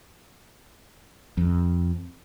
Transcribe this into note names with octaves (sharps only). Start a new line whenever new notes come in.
F2